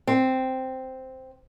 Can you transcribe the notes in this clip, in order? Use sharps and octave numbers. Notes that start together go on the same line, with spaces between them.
C4